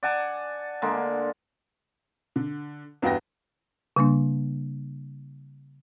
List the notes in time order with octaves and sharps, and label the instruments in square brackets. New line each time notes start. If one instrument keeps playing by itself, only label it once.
[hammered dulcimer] D5 F#5 G#5 A5
D3 G#3 A#3
[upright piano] D3
E2 G2 F#4 B4 G5 A#6
[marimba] C#3 G3 A#3 D4